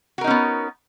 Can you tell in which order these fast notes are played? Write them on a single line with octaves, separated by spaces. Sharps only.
F#4 A#4 D#4 C#4 B3